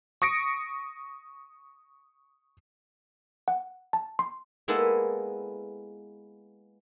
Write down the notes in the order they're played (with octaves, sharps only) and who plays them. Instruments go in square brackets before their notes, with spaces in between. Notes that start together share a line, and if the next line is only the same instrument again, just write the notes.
[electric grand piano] C#6 D#6 A#6 C#7 D7
[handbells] F#5
A5
C6
[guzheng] G#3 A#3 B3 E4 G#4 A4